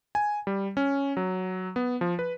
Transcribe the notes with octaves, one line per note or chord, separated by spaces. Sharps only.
G#5
G3
C#4
F#3
B3
F3
B4